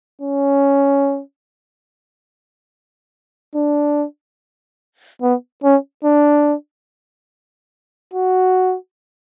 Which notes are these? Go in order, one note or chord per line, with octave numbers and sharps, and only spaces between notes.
C#4
D4
B3
C#4
D4
F#4